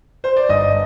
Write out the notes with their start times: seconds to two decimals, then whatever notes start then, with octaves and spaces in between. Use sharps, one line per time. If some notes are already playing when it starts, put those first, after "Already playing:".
0.24 C5
0.37 D5
0.49 G1 D#5